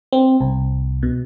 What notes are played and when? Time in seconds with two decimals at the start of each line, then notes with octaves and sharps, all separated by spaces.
0.12 C4
0.41 C2
1.03 B2